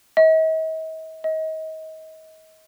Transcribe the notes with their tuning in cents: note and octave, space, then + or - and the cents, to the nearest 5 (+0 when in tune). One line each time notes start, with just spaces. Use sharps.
D#5 +45
D#5 +30